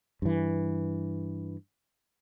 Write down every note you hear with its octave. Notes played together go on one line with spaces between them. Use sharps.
G2 E3